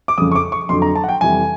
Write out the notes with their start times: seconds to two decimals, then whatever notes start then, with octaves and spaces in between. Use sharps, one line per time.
0.08 D6
0.18 F2 C#3 F3 D#6
0.32 C#6
0.35 D6
0.52 C#6
0.69 F2 D3 F#3 C6
0.82 A#5
0.95 A5
1.04 F#5
1.09 G5
1.21 F2 C3 E3 G3 G#5